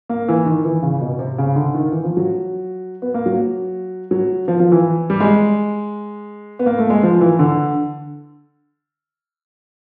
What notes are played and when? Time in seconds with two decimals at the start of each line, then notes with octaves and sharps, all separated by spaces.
0.09 A#3
0.29 E3
0.46 D#3
0.65 E3
0.82 C#3
1.01 B2
1.19 C3
1.38 C#3
1.56 D3
1.75 D#3
1.92 E3
2.04 F3
2.17 F#3
3.02 B3
3.14 A#3
3.26 F#3
4.11 F#3
4.48 F3
4.60 F3
4.72 E3
5.10 G3
5.20 G#3
6.59 B3
6.66 A#3
6.78 A3
6.90 G#3
7.03 F3
7.21 E3
7.39 D3